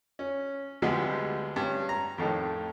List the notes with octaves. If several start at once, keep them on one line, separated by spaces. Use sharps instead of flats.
C#4
D2 C3 F3 G3 G#3 B3
G2 C#4
A#5
F2 A2 D#3 A4